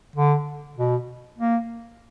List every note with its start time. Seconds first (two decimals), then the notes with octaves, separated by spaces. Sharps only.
0.16 D3
0.77 B2
1.39 A#3